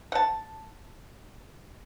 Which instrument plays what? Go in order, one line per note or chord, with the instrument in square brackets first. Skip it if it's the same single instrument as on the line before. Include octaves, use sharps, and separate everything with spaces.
[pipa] F#5 A5